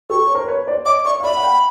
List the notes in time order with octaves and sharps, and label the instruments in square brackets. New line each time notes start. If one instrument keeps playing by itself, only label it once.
[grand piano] G4 A4 [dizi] C#6
[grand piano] C#5
A#4 C5
B4 C#5
C5 D5
[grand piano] C#5 D#5 [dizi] D6
[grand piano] D5 E5 [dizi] C#6
[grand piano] F5
[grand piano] D5 E5 [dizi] B5
[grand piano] F#5
F5 G5